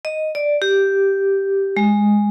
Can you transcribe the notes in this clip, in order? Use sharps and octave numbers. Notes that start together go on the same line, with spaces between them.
D#5
D5
G4
G#3